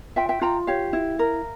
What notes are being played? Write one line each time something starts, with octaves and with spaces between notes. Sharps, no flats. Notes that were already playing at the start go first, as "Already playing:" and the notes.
F4 E5 G5
E5 G5
F4 G5 A#5
G4 C#5 F5
E4
A#4